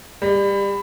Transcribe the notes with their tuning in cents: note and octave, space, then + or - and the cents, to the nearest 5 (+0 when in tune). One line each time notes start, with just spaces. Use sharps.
G3 +25